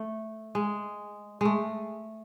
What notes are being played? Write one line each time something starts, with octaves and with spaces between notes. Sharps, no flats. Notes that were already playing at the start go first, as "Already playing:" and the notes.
Already playing: A3
G#3
G#3 A3